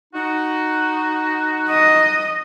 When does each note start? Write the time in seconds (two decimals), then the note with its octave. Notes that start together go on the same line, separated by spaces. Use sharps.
0.14 D#4 F#4
1.69 D#5